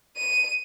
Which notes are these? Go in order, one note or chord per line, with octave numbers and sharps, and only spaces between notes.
D#7